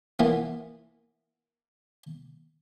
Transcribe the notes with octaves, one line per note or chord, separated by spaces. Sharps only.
E3 A#3 B3